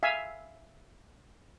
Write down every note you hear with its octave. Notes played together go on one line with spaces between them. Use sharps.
E5 F5 G#5